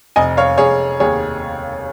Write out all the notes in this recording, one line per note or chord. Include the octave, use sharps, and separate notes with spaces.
F1 D#5 G#5
C#5 F5
F1 G#4 C#5
D#2 G#4 C#5